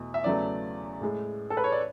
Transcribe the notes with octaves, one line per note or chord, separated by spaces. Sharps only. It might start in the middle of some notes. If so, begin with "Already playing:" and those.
Already playing: E2 B2 A3
E5
E2 C#3 F#3 A3 D5
A2 G#3
A4
B4
C#5
D5